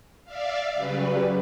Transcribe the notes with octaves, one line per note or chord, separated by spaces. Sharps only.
D5 E5 F5
C#3 F#3 G3 B4